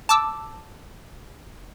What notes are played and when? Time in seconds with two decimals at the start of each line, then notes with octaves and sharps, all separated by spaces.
0.09 A5 D6 E6